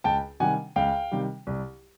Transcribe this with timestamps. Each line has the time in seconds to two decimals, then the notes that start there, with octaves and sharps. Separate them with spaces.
0.04 C#2 G5 A5
0.40 C3 D#3 G3 F#5 G#5
0.76 C#2 F5 G5
1.12 C3 D#3 G3
1.47 C2